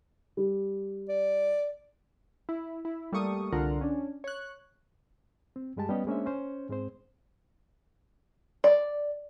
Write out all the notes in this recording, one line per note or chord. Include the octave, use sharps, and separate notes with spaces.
G3
D5
E4
E4
G3 A3 A#3 C#6 D#6
C2 D3 F4 A#4 F#5
C#4 D4
C#5 F#6
C4
G2 G3 G#3 G4 A5
G3 B3 C#4 G4 B4 D#5
G#3 A#3 C#4 D4 C5 E5
C#4 C5
G#2 G#3 C4 C5
D5